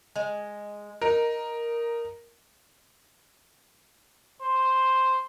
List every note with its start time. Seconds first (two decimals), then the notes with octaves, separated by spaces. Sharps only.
0.16 G#3
1.02 D#4 A#4
4.42 C5